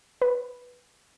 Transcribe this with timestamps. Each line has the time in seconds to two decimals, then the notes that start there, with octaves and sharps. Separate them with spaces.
0.22 B4